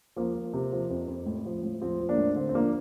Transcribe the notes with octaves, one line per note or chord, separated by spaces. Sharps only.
F3 A#3
F3
C3
F3
F2
F2
A2
F3
A2
F3 C4
F3
A#3 D4
A2
D3 C4
C4
F3 A#3 D4